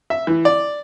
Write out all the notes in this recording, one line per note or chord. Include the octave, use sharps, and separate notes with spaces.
E5
E3
D5